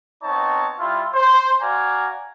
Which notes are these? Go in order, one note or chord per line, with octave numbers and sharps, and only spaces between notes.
B3 C4 D#4 C#5 A5
G3 E4 F4
C5
F#4 D5 F5 G#5 A#5